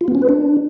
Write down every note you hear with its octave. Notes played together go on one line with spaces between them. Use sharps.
F4
B3
C#4
B4
D4